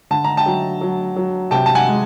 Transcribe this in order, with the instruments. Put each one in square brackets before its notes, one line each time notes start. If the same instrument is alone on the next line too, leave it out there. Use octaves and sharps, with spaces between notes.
[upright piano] D3 A5
A#5
G5 A5
F#3
F#3
F#3
C3 G5 A5
A5
F#5 G#5
G#3